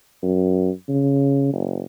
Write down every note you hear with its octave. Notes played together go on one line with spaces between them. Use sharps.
F#2
C#3
F#1